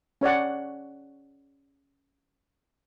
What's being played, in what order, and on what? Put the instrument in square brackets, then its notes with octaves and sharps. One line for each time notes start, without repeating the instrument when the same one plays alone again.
[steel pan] C#4 C#5 D5 F#5